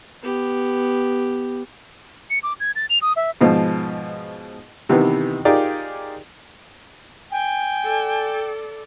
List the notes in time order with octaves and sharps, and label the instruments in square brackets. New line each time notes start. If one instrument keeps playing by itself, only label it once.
[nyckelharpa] B3 G4
[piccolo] C#7
D6
G#6
A6
F7
D#6
E5
[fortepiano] G#2 B2 F3
C3 D#3 E3 B3
D#4 F4 G4 G#4 A#4 D5
[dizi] G5 [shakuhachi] G#5
[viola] A4 D5